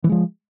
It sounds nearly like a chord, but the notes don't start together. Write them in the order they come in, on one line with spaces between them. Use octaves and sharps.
E3 G3 G#3 F3